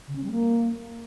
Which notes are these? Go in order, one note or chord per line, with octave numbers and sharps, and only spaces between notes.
C#3
C#4
G3
A#3